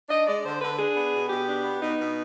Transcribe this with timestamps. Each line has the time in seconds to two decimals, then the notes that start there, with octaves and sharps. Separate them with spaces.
0.09 D4 D#5
0.26 G#3 D5
0.43 D3 C5
0.61 D3 B4
0.79 D4 G#4
0.95 B3
1.13 B2
1.29 B2 G4
1.46 D4
1.64 B3
1.81 B2 D#4
1.98 B2